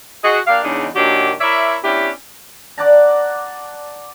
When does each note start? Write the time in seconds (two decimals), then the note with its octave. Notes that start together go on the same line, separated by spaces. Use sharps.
0.24 F#4 G#4 D#5
0.47 A#3 D4 G4 F5
0.64 E2 C#3 G#3 D4 D#4
0.96 A#2 D#3 F#3 D4 F#4 G4
1.41 E4 A#4 C#5 D5 E5
1.84 B3 C#4 D4 E4 G4
2.78 D5 F#5 A5 A#5